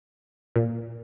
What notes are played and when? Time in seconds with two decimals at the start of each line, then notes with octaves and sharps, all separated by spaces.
0.56 A#2